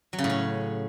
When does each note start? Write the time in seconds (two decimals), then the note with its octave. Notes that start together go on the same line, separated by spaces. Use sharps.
0.13 F#3
0.18 C#3
0.24 A2
0.30 C#4